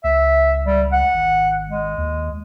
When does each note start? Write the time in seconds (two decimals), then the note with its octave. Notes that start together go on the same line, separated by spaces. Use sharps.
0.04 C#2 E5
0.65 G3
0.92 F#5
1.14 G#1
1.69 G#3
1.98 D#2